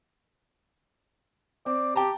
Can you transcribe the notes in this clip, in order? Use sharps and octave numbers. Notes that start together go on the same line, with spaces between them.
C4 D5
G4 G5 A5 A#5